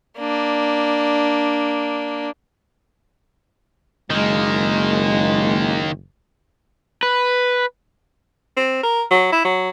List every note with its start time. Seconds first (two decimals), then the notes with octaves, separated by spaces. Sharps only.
0.18 A#3 D4
4.10 F#1 D#3 G#3 A#3
7.03 B4
8.57 C4
8.83 A#4
9.11 F#3
9.33 E4
9.45 F#3